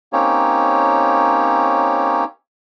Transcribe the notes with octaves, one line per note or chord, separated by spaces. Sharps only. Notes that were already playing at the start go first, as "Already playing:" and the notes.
A#3 C4 C#4 D#4 G4 C#5